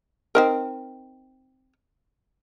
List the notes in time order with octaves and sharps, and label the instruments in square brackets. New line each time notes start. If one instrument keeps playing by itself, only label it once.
[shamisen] C4 D#4 A#4